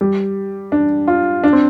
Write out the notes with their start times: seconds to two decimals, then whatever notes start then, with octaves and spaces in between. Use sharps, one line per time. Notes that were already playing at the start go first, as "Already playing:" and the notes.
0.01 G3
0.72 D4
1.08 F4
1.44 D4
1.53 C4